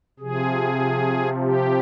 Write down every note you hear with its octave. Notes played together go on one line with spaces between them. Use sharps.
C3 F3 G#4
G4